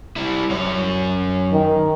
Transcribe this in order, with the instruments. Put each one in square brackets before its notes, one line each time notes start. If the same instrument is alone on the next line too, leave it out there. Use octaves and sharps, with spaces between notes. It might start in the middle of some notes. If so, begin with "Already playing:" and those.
[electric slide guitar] G3 E4
F#2 C#5
[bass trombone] D#3